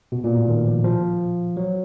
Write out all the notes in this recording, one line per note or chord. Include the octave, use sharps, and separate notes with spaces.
B2
A#2
A2
D#3
F3
F3
F#3